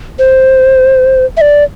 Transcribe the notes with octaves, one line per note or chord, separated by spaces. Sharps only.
C5
E5
D5